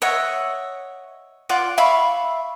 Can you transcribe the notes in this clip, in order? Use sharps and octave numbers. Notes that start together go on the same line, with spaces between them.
C#5 D#5 E5 F#5
F4 D5 F#5
E5 F5 B5 C#6